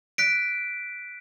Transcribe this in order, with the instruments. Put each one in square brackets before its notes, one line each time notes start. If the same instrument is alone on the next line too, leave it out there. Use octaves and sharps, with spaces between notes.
[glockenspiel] F#6 B6 D7